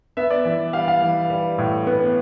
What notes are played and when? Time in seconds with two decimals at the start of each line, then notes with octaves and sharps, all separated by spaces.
0.17 B3 E5
0.30 D5
0.45 E3 E5
0.73 G3 F5
0.88 F5
1.01 E3
1.30 G3
1.58 A2
1.87 B3